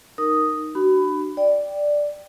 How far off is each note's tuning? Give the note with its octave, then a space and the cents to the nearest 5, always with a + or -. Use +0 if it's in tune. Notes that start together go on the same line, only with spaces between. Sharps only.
D#4 +0 A#4 +0 D#6 +0
D4 +35 F#4 +30 B5 +15
D5 +0 G5 +0